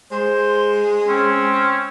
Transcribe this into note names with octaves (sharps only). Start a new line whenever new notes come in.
G#3 C5
C4 C#4